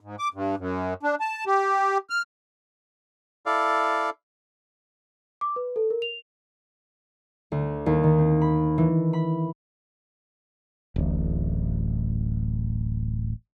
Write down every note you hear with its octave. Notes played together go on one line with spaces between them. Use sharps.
G#2
D6
G2
F#2
D4
A5
G4
F6
E4 A4 D5 F5
D6
B4
A4
A#4
F7
D2
D#2
D#3
C4
B5
E3
B5
D1 A1